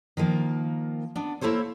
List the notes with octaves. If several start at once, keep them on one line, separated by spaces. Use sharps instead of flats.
D#3 F3 A#3
B3 D4
A#3 E4 A4 C5 C#5